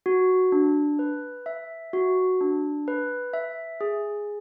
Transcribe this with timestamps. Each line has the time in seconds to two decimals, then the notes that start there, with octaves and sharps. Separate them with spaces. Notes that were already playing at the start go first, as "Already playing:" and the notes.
0.06 F#4
0.52 D4
0.99 B4
1.46 E5
1.93 F#4
2.41 D4
2.88 B4
3.34 E5
3.81 G#4